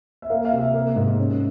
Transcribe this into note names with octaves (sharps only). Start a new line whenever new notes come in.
E5
A#3 F5
F5
C3
E5
A#3
G#2
C#4